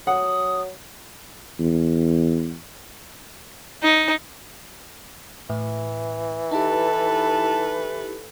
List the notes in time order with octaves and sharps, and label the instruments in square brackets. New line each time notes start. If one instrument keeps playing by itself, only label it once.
[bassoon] F#3 [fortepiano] F#5 [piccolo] D#6
[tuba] E2
[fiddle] D#4
[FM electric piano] A2 [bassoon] E3
[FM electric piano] D#4 E4 G4 [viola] A4 B4 [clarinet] A5